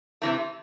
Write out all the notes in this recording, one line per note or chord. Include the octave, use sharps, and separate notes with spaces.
C3 E3 A3